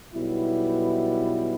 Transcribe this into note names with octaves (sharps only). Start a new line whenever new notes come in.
B1 B2 G3 B3 E4